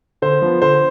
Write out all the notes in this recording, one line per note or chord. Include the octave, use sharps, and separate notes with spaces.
D3 C5
F3 B3
D3 C5